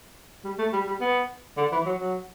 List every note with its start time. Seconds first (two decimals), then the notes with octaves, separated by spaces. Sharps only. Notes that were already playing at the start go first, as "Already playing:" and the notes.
0.44 G3
0.58 A3
0.73 G3
0.87 G3
1.01 B3
1.57 D3
1.72 E3
1.86 F#3
2.00 F#3